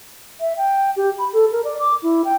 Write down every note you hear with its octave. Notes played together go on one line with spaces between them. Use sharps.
E5
G5
G4
B5
A4
A#4
D5
D6
E4
G5